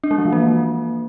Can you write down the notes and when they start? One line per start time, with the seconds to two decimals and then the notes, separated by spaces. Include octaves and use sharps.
0.04 D4
0.11 G#3
0.18 F3
0.25 E3
0.33 A#3